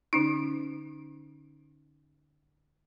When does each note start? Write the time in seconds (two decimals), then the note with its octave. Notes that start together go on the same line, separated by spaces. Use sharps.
0.13 D3 C#4 D#4